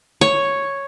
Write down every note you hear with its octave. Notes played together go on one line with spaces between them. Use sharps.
C#5